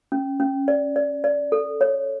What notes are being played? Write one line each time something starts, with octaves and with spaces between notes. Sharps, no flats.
C#4
C#4
D5
D5
D5
A4
C#5